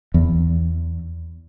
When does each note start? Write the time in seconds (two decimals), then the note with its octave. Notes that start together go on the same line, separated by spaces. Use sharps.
0.14 E2